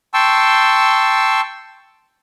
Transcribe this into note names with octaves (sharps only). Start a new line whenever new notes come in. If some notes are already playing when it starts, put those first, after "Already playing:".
G5 A5 C6 C#6 E6